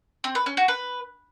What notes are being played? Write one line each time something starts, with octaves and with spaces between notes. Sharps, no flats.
C4
B4
C#4
F#4
B4